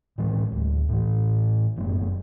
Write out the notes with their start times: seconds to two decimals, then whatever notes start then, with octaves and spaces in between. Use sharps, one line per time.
0.18 A2 E3 G#3
0.52 D1 D2
0.89 A2 E3
1.76 F1 F#2 A3 B3